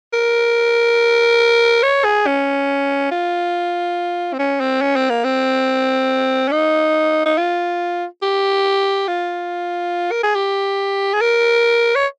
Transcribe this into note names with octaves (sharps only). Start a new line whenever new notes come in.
A#4
C#5
G#4
C#4
F4
C4
C#4
C4
C#4
C4
A#3
C4
C#4
D#4
D#4
F4
G4
F4
A#4
G#4
G4
G#4
A#4
C#5